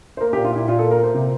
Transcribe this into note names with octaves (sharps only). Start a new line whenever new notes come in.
C5
A#3 A#4
G4
A#2
F4
A#2 E4
A#2 F4
A4
A#3
A#4
A#3 C5
C3